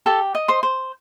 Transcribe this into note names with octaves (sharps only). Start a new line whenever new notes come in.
G4 A4 A5
D#5
C5 C6
C5